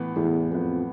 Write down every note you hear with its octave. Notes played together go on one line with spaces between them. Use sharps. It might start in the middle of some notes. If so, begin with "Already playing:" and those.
Already playing: A2 E3 B3
E2 A2
F2 E3 B3